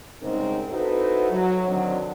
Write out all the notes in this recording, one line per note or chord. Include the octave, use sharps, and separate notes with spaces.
C2 G#2 C#3 C4 D#4 A#4
D#4 E4 F#4 A4 B4 C5
F#3
D3 D#3 F#3 C4 D4